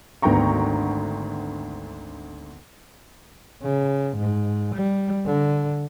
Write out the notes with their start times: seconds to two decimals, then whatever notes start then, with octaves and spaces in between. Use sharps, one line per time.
0.22 G#1 D2 B3 G5 A#5 C#6
3.63 C#3
4.17 G#2
4.75 G3
5.26 D3